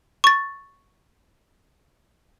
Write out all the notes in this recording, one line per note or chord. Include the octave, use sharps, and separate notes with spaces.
C#6 A6